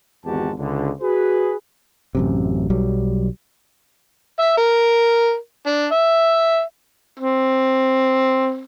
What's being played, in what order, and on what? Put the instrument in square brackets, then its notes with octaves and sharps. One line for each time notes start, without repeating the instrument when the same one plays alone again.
[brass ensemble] G#1 E2 G#2 F#4 G4 A5
C#2 D3
F#4 G#4 B4
[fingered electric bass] A1 F#2 C3
B1 F#3 G3
[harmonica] E5
A#4
D4
E5
C4